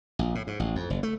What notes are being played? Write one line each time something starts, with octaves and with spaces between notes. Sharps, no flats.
A#1
A2
G#2
A1
F2
F#1
A3